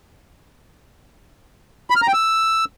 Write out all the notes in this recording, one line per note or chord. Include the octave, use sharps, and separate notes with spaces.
B5
F6
A#5
G5
E6